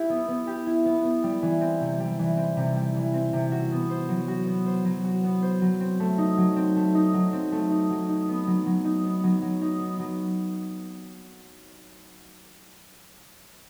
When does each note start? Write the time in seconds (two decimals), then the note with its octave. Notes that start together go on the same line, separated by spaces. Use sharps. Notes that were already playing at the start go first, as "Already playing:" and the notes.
Already playing: E4 G4
0.09 B3
0.28 B3
0.47 G4
0.66 E4
0.85 B3
1.04 B3
1.23 G3
1.42 E3
1.61 C4
1.81 C3
2.00 G3
2.19 E3
2.37 C4
2.57 C3
2.76 G3
2.95 E3
3.14 C4
3.33 C3
3.52 F#4
3.71 B3
3.90 C5
4.09 F#3
4.28 F#4
4.47 B3
4.66 C5
4.85 F#3
5.04 F#4
5.24 B3
5.42 C5
5.62 F#3
5.80 C4
6.00 A3
6.18 D#4
6.38 F#3
6.56 C4
6.76 A3
6.95 D#4
7.14 F#3
7.33 C4
7.52 A3
7.71 D#4
7.90 F#3
8.09 D#4
8.28 B3
8.47 F#3
8.67 F#3
8.85 D#4
9.05 B3
9.24 F#3
9.42 F#3
9.62 D#4
9.81 B3
9.99 F#3